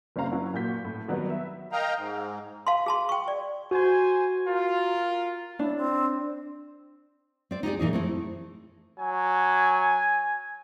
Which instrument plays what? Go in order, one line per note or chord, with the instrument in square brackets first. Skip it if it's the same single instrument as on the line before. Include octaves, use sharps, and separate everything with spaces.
[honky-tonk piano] F#1 G3 C#4 C5 F5 A#5
F#3 C#4 E4 F#4
A#2 F#4 G6 B6
A2
D#3 F#3 G3 B3
E5
[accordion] A#4 D#5 F5 G5 A#5
G#2
[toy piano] F5 A5 C6
G#4 A5 C6
G5 C#6
D5
[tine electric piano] F#4 [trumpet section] C5 G#5
[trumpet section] F4 A#4
[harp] D4 [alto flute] E4
[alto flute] C4
[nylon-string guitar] C4 D5
D#4 G4 G#4 D5
A#2 E3 D#4 G#4
A3 C4 E4
[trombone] F#3 [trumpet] G#5